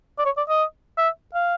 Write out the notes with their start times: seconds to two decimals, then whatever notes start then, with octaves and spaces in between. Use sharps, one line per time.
0.19 D5
0.26 C#5
0.38 D5
0.49 D#5
0.98 E5
1.34 F5